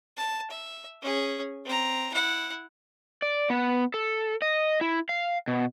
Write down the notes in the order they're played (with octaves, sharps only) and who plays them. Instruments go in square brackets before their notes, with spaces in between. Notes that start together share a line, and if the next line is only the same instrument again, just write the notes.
[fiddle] A5
E5
C#4 G#4
C4 A#5
E4 F#5
[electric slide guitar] D5
B3
A4
D#5
E4
F5
B2